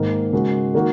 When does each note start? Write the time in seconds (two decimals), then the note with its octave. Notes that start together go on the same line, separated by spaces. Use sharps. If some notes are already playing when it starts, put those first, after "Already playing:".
Already playing: G#2 D#3 A#3
0.32 C#3 G#3 F#4 A#4
0.74 D#3 A#3 F#4